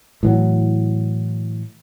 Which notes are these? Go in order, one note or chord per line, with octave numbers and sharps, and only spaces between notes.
A2 E3 F#3